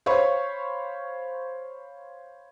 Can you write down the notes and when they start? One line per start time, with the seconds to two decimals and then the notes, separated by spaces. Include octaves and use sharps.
0.06 C5 C#5 F5 B5 C#6